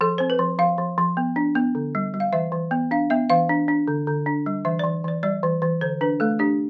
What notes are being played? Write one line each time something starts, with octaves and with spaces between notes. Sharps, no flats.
F3 A4
C4 C5
B4
F3
F3 F5
F3
F3
B3
D4
B3
D3
G3
G3
F5
E3 E5
E3
B3
D4 F5
B3 E5
E3 F5
D4
D4
D3
D3
D4
G3
E3 E5
E3 D5
E3 D5
G3 D5
E3
E3
D3 C5
D4 B4
A3 A4
D4 G4